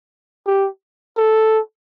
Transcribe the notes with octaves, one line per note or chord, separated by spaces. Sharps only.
G4
A4